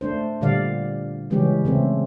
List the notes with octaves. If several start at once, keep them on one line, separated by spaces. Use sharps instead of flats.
A3 D4 C5
A#2 D3 G3 D5 F5
C#3 E3 G3 G#3 C#4 G4
C#3 A3 C4